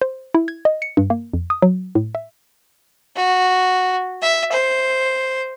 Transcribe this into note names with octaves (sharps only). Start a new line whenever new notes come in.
C5
E4
G#6
D#5
C#7
G2
A#3
F2
D#6
F#3
A2
E5
F#4
E5
C5